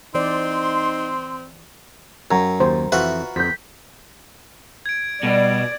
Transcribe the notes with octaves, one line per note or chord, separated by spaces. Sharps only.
E3 C4 D#4 C5 D5 C6
F#2 C#5 A#5
D#2 C5
F2 E3 F4 F#4 B4 E5
F2 C5 G6 B6
G#6 D7
B2 G3 D5